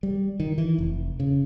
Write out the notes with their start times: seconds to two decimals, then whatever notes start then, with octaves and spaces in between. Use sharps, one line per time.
0.03 G3
0.40 D#3
0.58 E3
0.78 F1
1.20 C#3